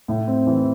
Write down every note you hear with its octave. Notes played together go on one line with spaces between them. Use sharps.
A2
C4
E3